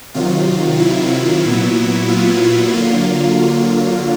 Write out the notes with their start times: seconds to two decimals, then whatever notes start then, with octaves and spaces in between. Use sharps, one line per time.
0.14 C3 D#3 F#3 F4
0.80 E4
1.45 A#2 F#3 B3
2.08 F4
2.73 D3 F#3 A#3 F4